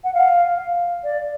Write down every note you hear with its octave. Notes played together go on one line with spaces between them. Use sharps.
F#5
F5
D5